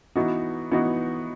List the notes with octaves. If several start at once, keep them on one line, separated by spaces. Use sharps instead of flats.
E3 B3 D#4 F#4
E3 B3 D#4 F#4